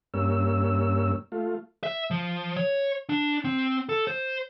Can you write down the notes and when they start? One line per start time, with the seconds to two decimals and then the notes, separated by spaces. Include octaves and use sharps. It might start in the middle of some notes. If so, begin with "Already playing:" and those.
0.14 G2 A#3 C#4 E6
1.32 A3 F4
1.83 E5
2.11 F3
2.56 C#5
3.10 D4
3.45 C4
3.89 A4
4.07 C5